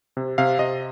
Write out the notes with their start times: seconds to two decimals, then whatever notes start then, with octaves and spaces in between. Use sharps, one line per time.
0.17 C3
0.38 C3 F5
0.59 C3 D#5